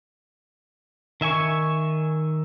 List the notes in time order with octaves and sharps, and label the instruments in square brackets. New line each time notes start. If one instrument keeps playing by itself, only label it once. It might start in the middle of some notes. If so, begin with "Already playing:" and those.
[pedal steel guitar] D#3 E5 G#5 C#6